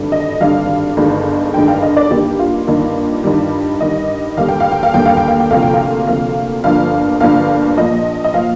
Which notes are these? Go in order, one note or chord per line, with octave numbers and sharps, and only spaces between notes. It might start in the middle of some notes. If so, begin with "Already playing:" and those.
Already playing: G#1 G2 D3 G3
D#5
G#1 G2 D3 G3 F5
G1 G2 D#3 G#3
G1 G2 D#3 G#3 G5
F5
D#5
D5
G2 D#3 A#3 G4
F4
G2 D#3 A#3
G2 D#3 G3
G2 D#3 G3 D#5
D#2 D3 G3 A#3 F5
G5
F5
G5
F5
D#2 D3 G3 A#3 G5
F5
G5
F5
G5
D2 C3 F3 A#3 F5
G5
F5
D2 C3 F3 A#3 F5
G1 G2 F3 A#3 F5
G1 G2 F3 A#3 F5
A#1 A#2 F3 D#5
D#5
A#2 F3 F5